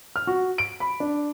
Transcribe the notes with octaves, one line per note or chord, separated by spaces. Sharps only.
F6
F#4
D7
B5
D4